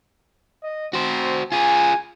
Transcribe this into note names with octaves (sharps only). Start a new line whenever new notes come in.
D#5
C4 F#4 C5
F4 G#4 G#5